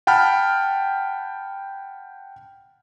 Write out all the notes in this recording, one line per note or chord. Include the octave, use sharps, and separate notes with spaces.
F#5 G5 A5 B5 F6